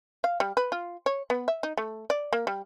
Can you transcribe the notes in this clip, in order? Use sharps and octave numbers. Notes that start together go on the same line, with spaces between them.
F5
G3
B4
F4
C#5
B3
E5
D#4
A3
D5
A#3
G3